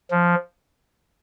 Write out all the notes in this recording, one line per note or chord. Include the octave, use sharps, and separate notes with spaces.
F3